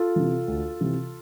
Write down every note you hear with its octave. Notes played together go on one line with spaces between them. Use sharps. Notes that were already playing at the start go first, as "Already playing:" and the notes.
Already playing: F4 A4
C3 E3
D2
C3 E3